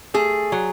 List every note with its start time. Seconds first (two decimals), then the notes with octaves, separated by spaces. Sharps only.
0.14 A3 G#4
0.52 F#3